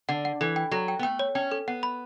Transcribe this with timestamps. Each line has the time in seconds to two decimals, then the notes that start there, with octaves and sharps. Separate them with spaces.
0.09 D3 F#5
0.25 F#5
0.41 E3 A4
0.56 G5
0.71 F#3 A4
0.88 G5
0.99 B3
1.03 A3 G5
1.19 C#5
1.35 C#4 G5
1.51 A4
1.68 B3 F#5
1.83 B5